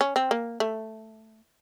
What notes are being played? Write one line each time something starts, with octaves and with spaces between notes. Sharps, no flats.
C#4
C4
A#3
A3